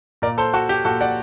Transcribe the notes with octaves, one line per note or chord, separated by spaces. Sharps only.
A#2 A#4 D5
A4 C5
F#4 A4
G4
A#2 F#4 A4
D5 F#5